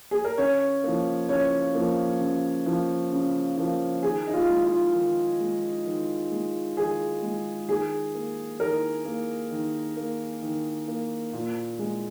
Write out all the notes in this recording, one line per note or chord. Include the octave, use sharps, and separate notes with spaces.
G#4
A#4
C#3 C#5
F3 A#3
C#3 C#5
F3 A#3
C#3
F3 A#3
C#3
F3 A#3
D#3 G#4
D#4
F4
G#3
F4
D#3
G#3
D#3
G#3
D#3 G#4
G#3
D#3 G#4
A#3
D#3 A#4
A#3
D#3
A#3
D#3
A#3
A#2
G#3